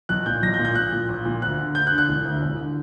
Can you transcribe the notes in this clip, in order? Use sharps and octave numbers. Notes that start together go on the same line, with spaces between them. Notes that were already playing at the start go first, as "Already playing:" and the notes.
B1 F#6
A#2 G6
B1 A#6
G6
A#2
G6
A#1 F#6
A#2
A#1
A#2
D2 F#6
D3
D2 G6
F#6
D3
F#6
E1
D2 D3
E1
D3